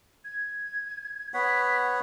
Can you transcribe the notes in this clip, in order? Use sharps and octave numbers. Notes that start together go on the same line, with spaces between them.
G#6
B3 C#5 F#5 B6